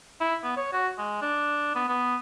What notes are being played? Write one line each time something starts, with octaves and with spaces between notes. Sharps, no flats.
E4
B3
C#5
F#4
G#3
D4
B3
B3